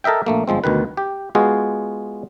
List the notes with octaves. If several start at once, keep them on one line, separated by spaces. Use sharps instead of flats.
A4 A#4 D#5 E5 G5
A#1 A3 A#3
G1 F3 G#3 C4
D2 B2 D#3 B4
G4
G#3 B3 F4 F#4 G#4